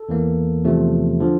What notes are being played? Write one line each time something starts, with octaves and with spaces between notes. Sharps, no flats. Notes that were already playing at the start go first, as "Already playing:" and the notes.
Already playing: A4
E2 E3 A#3
E2 C3 F3 A3
D3 F3